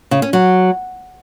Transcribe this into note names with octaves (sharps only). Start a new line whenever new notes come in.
C#3
C#4
F#3